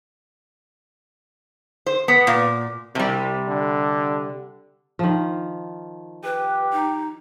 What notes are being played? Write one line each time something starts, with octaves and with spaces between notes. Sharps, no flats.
C5
B3
A#2
C2 C3 G3
D3
D#3 F3
G4 B4
D#4